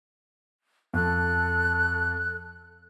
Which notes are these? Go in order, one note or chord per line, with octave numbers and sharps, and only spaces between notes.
F2 A4 F#6